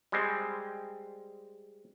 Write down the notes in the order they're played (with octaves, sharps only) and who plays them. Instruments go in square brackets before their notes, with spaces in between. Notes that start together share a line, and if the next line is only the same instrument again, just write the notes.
[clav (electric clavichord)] G3 G#3 C4